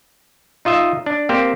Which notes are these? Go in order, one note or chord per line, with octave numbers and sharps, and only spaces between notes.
D#4 F4 D#5 E5
D4
A#3 C4 G4 C5